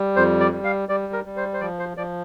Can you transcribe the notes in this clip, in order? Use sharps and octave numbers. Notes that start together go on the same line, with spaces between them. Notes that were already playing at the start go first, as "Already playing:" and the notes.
Already playing: G3
F2 C5
D5
G3
F5
G3 D5
A#4
G3
C5
C5
F3 D5
C5
F3 D5